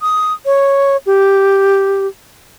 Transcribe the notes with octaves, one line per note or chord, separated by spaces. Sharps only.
D#6
C#5
G4